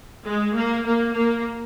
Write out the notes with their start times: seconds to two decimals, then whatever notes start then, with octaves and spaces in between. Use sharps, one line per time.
0.25 G#3
0.55 A#3
0.86 A#3
1.15 A#3